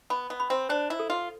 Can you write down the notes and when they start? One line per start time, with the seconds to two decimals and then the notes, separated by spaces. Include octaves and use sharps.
0.10 B3 B5
0.30 B3
0.40 B5
0.50 C4
0.69 D4 C5
0.90 E4
0.99 A4
1.10 F4